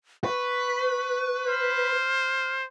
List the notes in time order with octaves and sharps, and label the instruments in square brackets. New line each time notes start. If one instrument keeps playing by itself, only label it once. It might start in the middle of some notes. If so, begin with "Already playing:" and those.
[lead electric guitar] B4 [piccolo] C#6
[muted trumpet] C5 [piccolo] F6